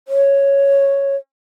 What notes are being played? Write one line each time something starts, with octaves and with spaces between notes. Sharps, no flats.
C#5